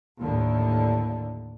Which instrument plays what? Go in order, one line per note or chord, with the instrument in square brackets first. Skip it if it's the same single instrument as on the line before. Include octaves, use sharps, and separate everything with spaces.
[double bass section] D#2 A2 D3